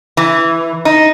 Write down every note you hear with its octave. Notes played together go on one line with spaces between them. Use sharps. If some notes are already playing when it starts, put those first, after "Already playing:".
E3
D#4